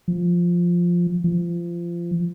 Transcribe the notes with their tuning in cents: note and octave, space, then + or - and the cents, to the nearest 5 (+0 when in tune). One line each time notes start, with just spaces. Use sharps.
F3 +0
F3 -25